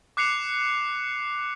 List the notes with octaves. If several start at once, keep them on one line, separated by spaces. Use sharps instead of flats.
D6 F#6 C7 C#7 F7